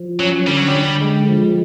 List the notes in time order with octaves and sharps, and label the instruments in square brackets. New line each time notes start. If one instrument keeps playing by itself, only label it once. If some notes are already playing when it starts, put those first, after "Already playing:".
Already playing: [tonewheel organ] F3
[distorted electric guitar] F#3 [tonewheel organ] C#4
[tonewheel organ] D3 [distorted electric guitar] G3
[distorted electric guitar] F#3
G3
[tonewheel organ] D3
G#3
F3